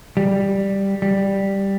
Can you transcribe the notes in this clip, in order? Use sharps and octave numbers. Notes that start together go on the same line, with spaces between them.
G3
G3